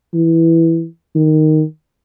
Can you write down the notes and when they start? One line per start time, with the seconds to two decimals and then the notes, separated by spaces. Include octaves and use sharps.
0.13 E3
1.15 D#3